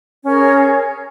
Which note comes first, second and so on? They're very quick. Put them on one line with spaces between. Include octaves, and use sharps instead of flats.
C#4 A#4 C#5 G#4